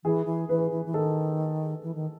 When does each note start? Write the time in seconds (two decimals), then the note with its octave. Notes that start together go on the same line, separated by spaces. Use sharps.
0.04 E3 G#4
0.26 E3
0.49 E3 B4
0.71 E3
0.86 E3
0.94 D#3 A4
1.83 E3
1.95 D#3